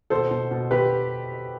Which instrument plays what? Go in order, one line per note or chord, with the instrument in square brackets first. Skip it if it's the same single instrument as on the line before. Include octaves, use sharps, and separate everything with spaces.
[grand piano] B2 A4 C5
B2
B2
B2 G4 B4